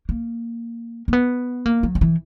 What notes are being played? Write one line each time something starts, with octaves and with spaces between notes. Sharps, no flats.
A#3
A#3
B3
A#3
F#3
D#3
E3